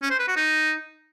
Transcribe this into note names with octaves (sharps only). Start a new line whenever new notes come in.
C#4
C5
B4
F#4
D#4